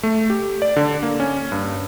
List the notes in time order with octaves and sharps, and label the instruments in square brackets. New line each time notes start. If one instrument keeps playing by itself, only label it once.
[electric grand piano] A3
G4
D5
D3
A#3
C#4
G2